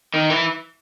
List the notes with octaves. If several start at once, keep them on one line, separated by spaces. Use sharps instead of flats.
D#3
E3